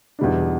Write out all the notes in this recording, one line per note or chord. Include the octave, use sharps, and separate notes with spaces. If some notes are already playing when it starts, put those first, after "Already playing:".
E2 B2 G3 D4